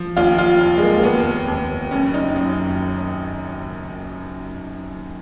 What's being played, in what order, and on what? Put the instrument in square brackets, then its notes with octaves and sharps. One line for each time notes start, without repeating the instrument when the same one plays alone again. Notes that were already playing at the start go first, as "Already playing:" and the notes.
Already playing: [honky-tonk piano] F3
D#2 F4
F4
F1
G#3
A#3
D#2 B3
D#2
F#1 C#4
D#4
F#2